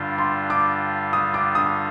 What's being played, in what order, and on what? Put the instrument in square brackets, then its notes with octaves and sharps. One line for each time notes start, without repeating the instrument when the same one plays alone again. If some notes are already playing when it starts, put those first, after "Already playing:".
Already playing: [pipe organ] G2 D3 G3 D4 F4
[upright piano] C6
D6
D#6
D6
D#6